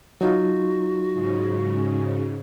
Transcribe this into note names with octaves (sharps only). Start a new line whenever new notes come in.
F#3 D#4 F4 F#4
G#2 C#3